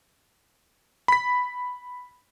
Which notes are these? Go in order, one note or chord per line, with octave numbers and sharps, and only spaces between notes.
B5 B6